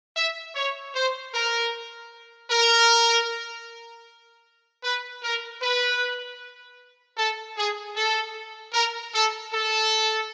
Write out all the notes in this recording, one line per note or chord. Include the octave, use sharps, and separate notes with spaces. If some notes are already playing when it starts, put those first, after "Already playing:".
E5
C#5
C5
A#4
A#4
B4
A#4
B4
A4
G#4
A4
A#4
A4
A4